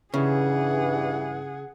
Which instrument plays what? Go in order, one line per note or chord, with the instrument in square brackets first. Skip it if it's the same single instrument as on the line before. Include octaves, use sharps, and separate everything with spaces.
[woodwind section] G2 E3 [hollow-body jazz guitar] C#3 [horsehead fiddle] G#4 F#5